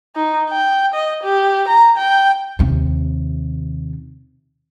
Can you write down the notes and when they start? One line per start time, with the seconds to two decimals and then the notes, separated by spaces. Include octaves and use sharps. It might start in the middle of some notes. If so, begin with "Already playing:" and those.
0.16 D#4
0.49 G5
0.94 D#5
1.23 G4
1.68 A#5
1.97 G5
2.59 D#2 C3